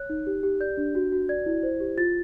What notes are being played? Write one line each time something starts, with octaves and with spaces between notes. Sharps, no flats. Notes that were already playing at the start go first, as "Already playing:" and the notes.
Already playing: C#5 F#6
D#4
G4
G4
D5 G6
D4
F#4
F#4
D5 G#6
E4
C5
G4
F4 A6